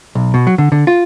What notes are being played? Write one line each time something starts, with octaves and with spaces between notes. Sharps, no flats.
B1
B2
F#3
D3
D3
F4